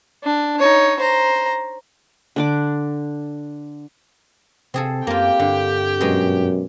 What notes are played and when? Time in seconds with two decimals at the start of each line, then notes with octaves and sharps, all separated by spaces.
0.24 D4
0.59 D#4 C#5
0.99 C5 A#5
2.36 D3 D4 D6
4.74 C3 C4 G#4 A4
5.07 F#2 A#3 F4 G4 G5
5.39 G2 D3
6.01 F#2 B2 G#3